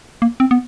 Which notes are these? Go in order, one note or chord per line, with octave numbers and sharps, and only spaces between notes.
A#3
C4
B3